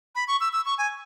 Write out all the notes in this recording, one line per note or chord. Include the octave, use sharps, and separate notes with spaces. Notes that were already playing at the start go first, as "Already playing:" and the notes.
B5
C#6
E6
E6
C#6
G#5